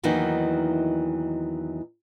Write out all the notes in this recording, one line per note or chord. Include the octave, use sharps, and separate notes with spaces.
E2 D#3 E3 F#3 A#3 D#4